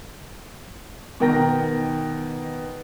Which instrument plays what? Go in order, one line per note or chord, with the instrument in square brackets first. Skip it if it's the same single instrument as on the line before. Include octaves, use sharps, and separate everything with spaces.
[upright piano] B2 D#3 A#4 G5 A#5 A#6